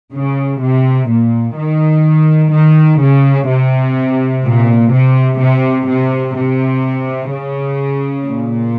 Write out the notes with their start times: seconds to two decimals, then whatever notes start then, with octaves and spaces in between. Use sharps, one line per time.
0.13 C#3
0.62 C3
1.09 A#2
1.58 D#3
2.53 D#3
3.01 C#3
3.48 C3
4.44 A#2
4.92 C3
5.40 C3
5.88 C3
6.35 C3
7.31 C#3
8.26 A#2